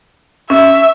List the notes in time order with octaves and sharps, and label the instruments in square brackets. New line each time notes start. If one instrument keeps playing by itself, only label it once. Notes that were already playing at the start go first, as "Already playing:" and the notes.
[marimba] C#4 [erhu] E5